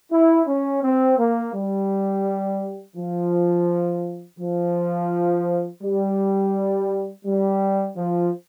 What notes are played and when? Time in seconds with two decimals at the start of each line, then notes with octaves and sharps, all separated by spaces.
0.11 E4
0.47 C#4
0.82 C4
1.18 A#3
1.54 G3
2.97 F3
4.40 F3
5.82 G3
7.25 G3
7.97 F3